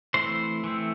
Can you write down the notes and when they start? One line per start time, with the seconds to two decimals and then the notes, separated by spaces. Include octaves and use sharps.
0.14 E3 A3 C4 C5
0.64 E3 A3 C4